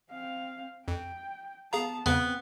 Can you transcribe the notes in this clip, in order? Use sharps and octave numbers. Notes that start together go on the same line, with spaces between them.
C4 F5
F2 G5
B3 G#4 F5 A5 A#5
E2 C#3 B3 C4